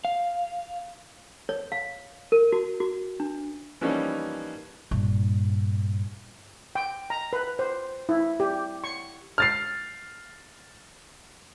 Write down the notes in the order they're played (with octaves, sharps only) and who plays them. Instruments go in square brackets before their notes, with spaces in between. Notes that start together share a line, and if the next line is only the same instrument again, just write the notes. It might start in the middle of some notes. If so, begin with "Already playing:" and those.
[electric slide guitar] F5
[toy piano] C#5
F5
A#4
F#4
F#4
D4
[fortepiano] E3 F3 G3 A#3 C#4 D#4
[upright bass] G2 A#2
[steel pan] G5
A#5
B4
C5
E4
G4
C#6
[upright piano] F6 A6 C7